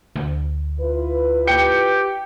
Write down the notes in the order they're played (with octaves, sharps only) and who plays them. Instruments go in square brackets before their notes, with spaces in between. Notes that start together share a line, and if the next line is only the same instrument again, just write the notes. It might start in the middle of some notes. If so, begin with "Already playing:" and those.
[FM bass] D2
[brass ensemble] E4 F4 B4
[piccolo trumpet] G4 [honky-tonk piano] G5 C#7